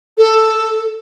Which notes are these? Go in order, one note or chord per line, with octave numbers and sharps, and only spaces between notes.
A4